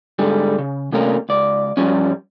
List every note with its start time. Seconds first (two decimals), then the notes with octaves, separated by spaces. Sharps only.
0.19 G#2 D3 G3 G#4
0.59 C#3
0.92 C3 G3 A3 A#3 C#4 A#4
1.29 C#2 D5
1.77 G2 F3 G3 G#3 C#4